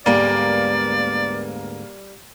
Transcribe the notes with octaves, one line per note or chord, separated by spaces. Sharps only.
D2 G#2 G3 A#3 B3 D5